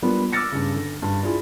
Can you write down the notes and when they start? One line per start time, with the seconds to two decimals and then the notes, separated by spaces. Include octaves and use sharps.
0.03 G3 A#3 B3 D4 F4
0.32 D6 E6 F6 A6 A#6 C#7
0.52 G2 C#3
0.75 D3
1.02 G2
1.23 D4 E4 F4 G#4